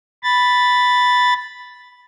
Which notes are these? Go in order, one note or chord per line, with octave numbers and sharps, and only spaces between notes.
B5 A6